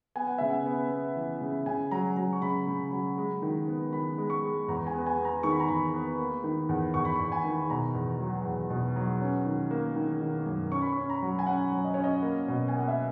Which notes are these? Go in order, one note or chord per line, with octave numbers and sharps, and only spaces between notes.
B3 G#5
F#5
C#3 E5
F#5
B3
B3
E3
C#3
C#3 G#5
F#3 A#5
F#3 A#5
C#6
C#3 B5
C#3
F#3
G#3
D#3
B3
D#3 B5
G#3
C#6
G#3
E2 A#5
G#5
B3
G#5
B3
A#5
D#3 C#6
B5
A#5
E2 B5
B3
A#3
D#3
E2
E2 C#6
B5
E2 C#6
G#5
D#3
B2 A#5
E2
F#3
E2
B2
F#3
C#4
D#3
A#3
D#3
D#3
F#2
C#4 C#6
B5
C#4 C#6
A#5
F#3
G#5
C#4 F#5
F#3
D#5
C#4 C#5
D#5
A#3
B2
A#3 G#5
F#5
E5